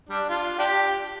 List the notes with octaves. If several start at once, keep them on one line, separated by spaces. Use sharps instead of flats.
G3 D4
F4
D4 G4